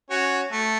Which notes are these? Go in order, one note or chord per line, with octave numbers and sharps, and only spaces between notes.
C#4 F#4
A3